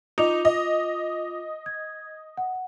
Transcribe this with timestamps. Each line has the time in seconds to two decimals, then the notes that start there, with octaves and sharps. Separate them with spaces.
0.18 D#4 F4 D6 F7
0.45 D#5
1.66 G#6
2.37 F#5